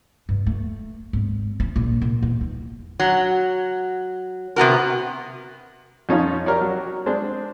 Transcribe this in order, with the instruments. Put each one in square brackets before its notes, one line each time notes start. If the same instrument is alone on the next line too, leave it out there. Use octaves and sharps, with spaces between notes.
[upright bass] G2
A3
G#1
C#4
A#1
A#2
E2
D#4
[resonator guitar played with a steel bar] F#3
C3 B3 F#4 A#4
[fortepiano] F2 C#4 D#4 F4
G4 A#4 C#5 D5
F#3
G#3 C4 D4 G#4